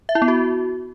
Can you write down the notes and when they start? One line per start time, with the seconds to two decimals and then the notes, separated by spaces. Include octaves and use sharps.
0.09 E5
0.15 E4
0.22 B3
0.28 F#4